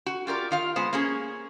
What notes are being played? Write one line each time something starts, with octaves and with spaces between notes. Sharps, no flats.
F#4
F4 G4 A#4 D5
D#3 F4 F5
G#3 B3 C5
A#3 C#4 G#4